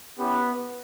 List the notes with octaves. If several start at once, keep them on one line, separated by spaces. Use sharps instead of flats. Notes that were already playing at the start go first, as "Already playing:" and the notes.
B3 C#4 E4 G4 B4